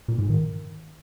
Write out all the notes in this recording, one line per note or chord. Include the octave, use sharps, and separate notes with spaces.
A#2
G#2
D#3